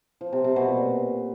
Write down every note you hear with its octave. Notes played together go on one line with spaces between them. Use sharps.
F3
C3
C3
B2
A#2